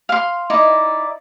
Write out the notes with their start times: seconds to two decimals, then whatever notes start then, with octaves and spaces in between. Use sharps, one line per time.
0.09 F5 C6
0.50 D#4 E4 D5 D#5